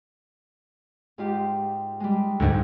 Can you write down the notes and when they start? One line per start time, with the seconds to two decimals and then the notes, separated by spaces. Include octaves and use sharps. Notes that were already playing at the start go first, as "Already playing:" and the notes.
1.18 G#2 F4 G4
2.00 G3 G#3
2.40 D2 G#2 G#4